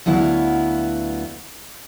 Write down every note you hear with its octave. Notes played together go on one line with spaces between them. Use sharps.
D2 F#3 B3 E4 F5